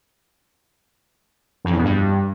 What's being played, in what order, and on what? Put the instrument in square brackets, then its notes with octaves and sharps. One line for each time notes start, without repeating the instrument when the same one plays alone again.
[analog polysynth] F2
E2
B2
G2